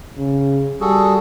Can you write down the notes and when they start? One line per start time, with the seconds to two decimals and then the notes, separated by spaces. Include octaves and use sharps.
0.17 C#3
0.81 G3 F#4 G#4 A4